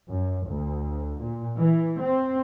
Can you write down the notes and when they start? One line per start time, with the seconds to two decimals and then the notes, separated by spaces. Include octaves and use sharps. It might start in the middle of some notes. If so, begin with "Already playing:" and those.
0.10 F#2
0.47 D2
1.21 A#2
1.58 E3
2.01 C4